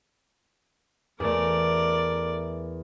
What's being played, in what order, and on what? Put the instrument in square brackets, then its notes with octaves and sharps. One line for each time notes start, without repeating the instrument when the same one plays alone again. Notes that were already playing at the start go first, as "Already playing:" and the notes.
[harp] E2 A3 [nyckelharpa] A#4 D5